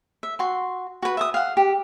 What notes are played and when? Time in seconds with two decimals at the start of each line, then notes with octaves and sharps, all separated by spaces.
0.23 E5
0.39 F#4 C6
1.02 F#4 B4
1.17 E5 A#5 D#6
1.34 F5 F#5
1.57 G4